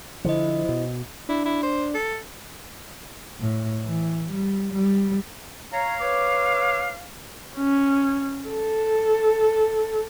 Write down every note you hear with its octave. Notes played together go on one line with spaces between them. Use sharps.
D3 F3 E4 C5 D#5
B2
D4 E4
E4
C5
A4
A2
E3
G3
G3
C#5 F5 A#5
B4 C#5 D6
C#4
A4